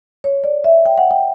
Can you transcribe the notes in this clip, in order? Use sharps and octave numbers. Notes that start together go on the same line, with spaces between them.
C#5
D5
E5
G5
F#5
G5